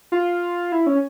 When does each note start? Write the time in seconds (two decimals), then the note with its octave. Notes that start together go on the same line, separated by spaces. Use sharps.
0.12 F4
0.72 E4
0.87 C#4